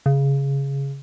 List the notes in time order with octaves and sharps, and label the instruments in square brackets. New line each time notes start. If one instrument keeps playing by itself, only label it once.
[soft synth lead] C#3